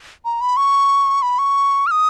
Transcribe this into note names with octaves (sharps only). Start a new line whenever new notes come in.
A#5
B5
C#6
B5
C#6
F6
D#6